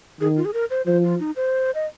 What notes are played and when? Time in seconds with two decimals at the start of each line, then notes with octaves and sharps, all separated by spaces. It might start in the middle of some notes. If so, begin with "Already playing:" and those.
0.21 D#3 G#4
0.37 F4
0.45 G#4
0.54 A#4
0.70 C5
0.86 F3 C5
1.04 F4
1.20 D#4
1.36 C5
1.75 D#5